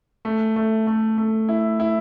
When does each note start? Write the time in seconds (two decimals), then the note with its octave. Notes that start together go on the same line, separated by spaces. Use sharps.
0.25 A3
0.56 A3
0.87 A3
1.18 A3
1.49 E4
1.80 E4